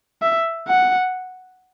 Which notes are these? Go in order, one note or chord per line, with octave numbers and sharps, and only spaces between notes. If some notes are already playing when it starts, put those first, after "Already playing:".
E5
F#5